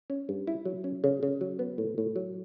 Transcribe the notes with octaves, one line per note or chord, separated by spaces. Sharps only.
C#4
G2
E4
F#3
C#4
C#3
C#3
F#3
B3
A2
A2
F#3